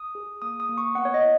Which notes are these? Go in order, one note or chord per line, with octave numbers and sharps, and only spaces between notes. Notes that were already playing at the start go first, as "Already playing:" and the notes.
Already playing: D#6
G#4
A#3 D#6
D#6
A#3
C#6
B3 F#5
C#5
D#5
E4